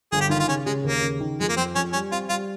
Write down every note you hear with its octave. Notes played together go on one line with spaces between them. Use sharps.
G1 G#4
G4
D#3 F4
F4
C#3 C#4
C#3 G#3
D#2 A#3
C#3
D#3
F2 G#3
A#3
F2 C4
F2 C#4
G3 C#4
C4 F4
G3 F4